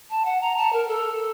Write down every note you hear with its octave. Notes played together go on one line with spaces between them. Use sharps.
A5
F#5
A#5
A5
A#4
A4